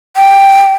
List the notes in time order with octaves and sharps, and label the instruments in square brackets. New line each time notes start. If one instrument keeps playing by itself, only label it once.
[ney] G5